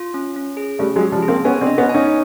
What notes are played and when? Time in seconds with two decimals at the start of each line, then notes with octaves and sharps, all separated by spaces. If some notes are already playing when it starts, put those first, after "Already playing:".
Already playing: F4
0.14 C#4
0.36 C#4
0.57 G#4
0.79 G3 A3 C#4
0.96 F#3 G#3
1.01 C#4
1.12 F3 G3
1.23 G#4
1.28 A#3 C4
1.45 B3 C#4 G#5
1.61 C4 D4
1.67 D#5
1.78 B3 C#4
1.89 G#5
1.94 C#4 D#4